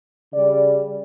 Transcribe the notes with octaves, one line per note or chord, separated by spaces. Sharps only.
C#3 G3 D5